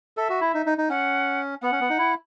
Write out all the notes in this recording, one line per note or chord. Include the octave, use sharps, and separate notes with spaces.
A4 E5
F#4
E4
D#4
D#4
D#4
C#4 F#5
B3 F#5
C#4
B3
D#4
E4